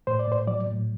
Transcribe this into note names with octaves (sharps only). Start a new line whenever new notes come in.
A2 C5
D5
A2 C5
F#3 D5
A2